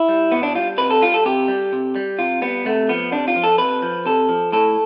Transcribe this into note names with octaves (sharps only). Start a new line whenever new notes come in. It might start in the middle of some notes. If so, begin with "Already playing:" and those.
Already playing: E4
G3
B2 B3
D4
G3 F4
C3 B4
A4
G3 F4
A4
C3 G4
G3
C3
G3
C3 F4
G3 B3
C3 A3
F3 B3
C3 D4
F4
F3
A4
C3 B4
F3
C3 A4
F3
A2 A4